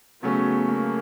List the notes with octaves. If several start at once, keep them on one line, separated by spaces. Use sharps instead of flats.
C#3 F#3 A3 B3 C#4
A#3